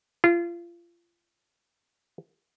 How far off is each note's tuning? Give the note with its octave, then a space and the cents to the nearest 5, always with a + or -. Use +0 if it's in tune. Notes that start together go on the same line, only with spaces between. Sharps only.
F4 -30